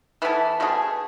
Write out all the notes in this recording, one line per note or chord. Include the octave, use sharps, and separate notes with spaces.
E3 B3 E4 A4
B2 A3 E4 G#4